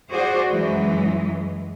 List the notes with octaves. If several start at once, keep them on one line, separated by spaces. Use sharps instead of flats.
F#4 G#4 C5 D5
F#2 E3 F#3 G#3